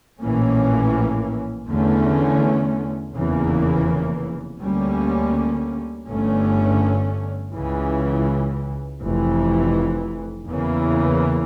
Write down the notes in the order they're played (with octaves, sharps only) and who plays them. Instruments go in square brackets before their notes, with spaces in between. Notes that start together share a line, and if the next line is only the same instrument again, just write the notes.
[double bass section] A#1 A2 E3 A#3 C#4
E2 D3 A3 C#4
F1 E2 C#3 E3 A#3
D2 D3 G3 A#3 C#4
G1 G2 D3 A3 C#4
C#2 C#3 E3
F1 F2 E3
E2 C#3 E3 A#3